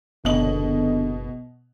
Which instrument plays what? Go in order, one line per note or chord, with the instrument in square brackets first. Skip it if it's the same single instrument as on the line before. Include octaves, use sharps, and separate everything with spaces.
[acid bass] F#1 [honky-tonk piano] B2 D#5 F#7 [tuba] D3